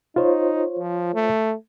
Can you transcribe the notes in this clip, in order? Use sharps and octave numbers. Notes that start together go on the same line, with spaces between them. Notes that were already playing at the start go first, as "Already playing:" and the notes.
D#4 F4 C5 C#5
F3
A3